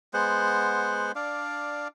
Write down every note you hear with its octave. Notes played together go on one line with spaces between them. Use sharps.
G#3 B3 C5 F#5
D4 D5 F5